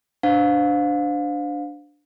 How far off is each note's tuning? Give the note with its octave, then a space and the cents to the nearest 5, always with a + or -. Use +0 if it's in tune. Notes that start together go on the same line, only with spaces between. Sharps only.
D4 +0 C5 -30 F5 +25